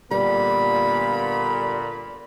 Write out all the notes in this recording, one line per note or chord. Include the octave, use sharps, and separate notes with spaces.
A#2 D3 G3 B3 B5